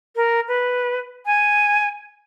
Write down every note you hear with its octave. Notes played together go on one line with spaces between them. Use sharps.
A#4
B4
G#5